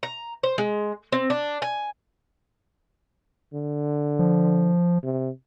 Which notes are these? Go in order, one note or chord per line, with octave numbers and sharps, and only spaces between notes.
A#5
C5
G#3
C4
D4
G#5
D3
F3
C3